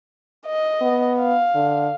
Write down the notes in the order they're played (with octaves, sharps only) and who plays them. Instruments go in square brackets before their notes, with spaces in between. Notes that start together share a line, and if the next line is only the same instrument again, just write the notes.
[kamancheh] D#5
[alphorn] B3
[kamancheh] F5
[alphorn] D3